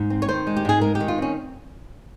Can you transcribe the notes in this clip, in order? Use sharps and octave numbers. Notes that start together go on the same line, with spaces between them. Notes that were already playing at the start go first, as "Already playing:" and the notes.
Already playing: G#2
C4
C#5
D#3 C5
G#3
G4
G#2 G#4
G#3 A#4
G4
D#3
F4
C4 C#4